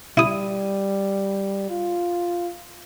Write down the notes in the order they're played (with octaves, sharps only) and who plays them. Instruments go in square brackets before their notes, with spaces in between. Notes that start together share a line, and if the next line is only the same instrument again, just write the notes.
[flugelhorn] G3 [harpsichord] E4 D#6
[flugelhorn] F4